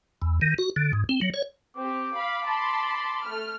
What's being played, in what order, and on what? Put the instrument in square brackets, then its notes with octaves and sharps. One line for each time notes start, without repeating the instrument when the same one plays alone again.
[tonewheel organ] E2
D#3
F#4
D3
G#2
C4
F#3
C#5
[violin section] C4 G4 [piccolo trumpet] D6
[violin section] F5 B5
A5 B5 C6
A3 F6